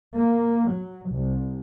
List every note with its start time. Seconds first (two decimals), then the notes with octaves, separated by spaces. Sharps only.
0.15 A#3
0.70 F#3
1.10 C2